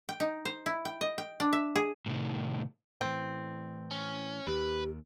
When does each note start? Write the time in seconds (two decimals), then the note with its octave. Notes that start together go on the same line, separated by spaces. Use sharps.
0.09 G5
0.20 D#4
0.45 C5
0.66 E4
0.85 G5
1.01 D#5
1.18 G5
1.40 D4
1.53 E5
1.76 G#4
2.06 A2 C3 D#3
3.01 A2 E3 C4
3.91 C#4
4.47 D#2 D#3 G4 B4